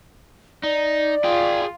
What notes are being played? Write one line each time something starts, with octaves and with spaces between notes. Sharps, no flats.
D#4 D5
F4 G#4 G5